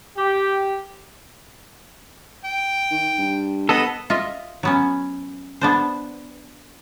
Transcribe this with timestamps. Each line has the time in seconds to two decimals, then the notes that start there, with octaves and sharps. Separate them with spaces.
0.18 G4
2.44 G5
2.91 D#3
3.18 G2
3.69 B3 A4 D#5
4.10 F4 D#5 E5
4.63 F#3 B3 C#4
5.61 B3 D4 C5